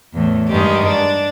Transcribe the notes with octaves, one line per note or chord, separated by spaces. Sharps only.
E2 A2
G2 D#3 G#3 G4
D4